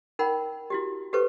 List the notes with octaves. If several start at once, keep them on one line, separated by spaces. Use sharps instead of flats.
D#4 A#4 F#5 G5 B5
E4 F#4 G4
G4 A4 B4 C5 C#6